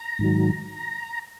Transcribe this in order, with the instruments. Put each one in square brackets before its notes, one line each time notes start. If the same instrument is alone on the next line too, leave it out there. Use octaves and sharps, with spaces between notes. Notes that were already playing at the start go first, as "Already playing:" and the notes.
Already playing: [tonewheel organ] A#5
G#2 D#3 F#3